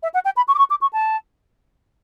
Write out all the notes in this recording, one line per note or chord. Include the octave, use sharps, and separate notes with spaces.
E5
F#5
G5
B5
C#6
D6
C#6
D6
C#6
A5